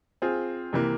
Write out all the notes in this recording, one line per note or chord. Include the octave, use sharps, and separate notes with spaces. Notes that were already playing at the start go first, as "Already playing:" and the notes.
C4 F4 G#4
C3 E3 A#3